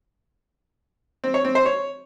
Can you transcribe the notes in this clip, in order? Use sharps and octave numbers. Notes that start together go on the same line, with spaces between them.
C4
C#5
C4
C5
C#5